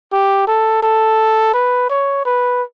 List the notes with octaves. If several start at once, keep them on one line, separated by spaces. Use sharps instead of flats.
G4
A4
A4
B4
C#5
B4